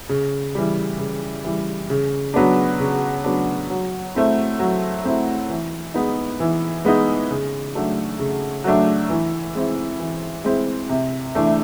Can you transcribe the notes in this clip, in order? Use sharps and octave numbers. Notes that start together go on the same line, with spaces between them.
C#3
E3 G3
C#3
E3 G3
C#3
F#3 B3 D4
C#3
F#3 B3 D4
F#3
A3 C4 E4
F#3
A3 C4 E4
E3
G#3 B3 D#4
E3
G#3 B3 D#4
C#3
F#3 A3 D4
C#3
F#3 A3 D4
E3
G#3 C4 E4
E3
G#3 C4 E4
C3
E3 A3 D4